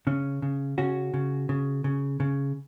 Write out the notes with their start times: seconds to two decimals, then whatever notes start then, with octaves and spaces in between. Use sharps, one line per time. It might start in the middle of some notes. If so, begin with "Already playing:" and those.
0.07 C#3 C#4
0.42 C#3
0.78 C#3 C#4 F#4
1.14 C#3
1.49 C#3
1.84 C#3
2.20 C#3